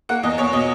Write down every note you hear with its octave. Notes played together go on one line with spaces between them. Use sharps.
A#3 F#5
E2 D#5
E2 C#5
B2 D#5